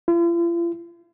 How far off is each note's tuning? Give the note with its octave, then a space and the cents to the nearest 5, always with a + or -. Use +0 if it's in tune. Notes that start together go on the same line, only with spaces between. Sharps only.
F4 -45